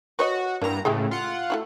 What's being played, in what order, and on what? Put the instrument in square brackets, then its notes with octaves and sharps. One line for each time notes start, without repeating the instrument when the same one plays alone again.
[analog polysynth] F#4 [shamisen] B4 C#5 D#5
[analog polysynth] G2 A#5 [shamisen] E3 A#3
[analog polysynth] A2 C#3 [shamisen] G#3 A3 G4
[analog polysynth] F4 F#5
[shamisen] A3 E4 F#4